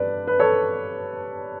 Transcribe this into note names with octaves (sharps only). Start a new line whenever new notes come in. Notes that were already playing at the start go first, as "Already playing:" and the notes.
Already playing: G2 B4 D5
B4
A4 C#5